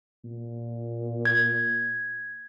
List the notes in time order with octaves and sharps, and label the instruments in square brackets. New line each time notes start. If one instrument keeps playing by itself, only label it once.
[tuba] A#2
[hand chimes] G#6